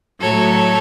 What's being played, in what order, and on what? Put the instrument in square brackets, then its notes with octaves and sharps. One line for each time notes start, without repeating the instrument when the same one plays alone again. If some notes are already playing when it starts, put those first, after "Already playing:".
[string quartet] A2 F#3 A4 C#5